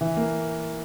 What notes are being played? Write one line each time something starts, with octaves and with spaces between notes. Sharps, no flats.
E3
A#3